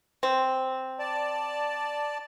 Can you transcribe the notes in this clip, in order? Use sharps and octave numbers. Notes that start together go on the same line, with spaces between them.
C4
D5 A5